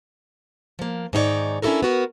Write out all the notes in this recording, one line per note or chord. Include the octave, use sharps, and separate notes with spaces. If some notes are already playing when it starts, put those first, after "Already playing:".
F3 A#3
G#2 D#3 D#4 E4 C#5 D5
C#4 D4 E4 F#4 A4 A#4
B3 F#4 A#4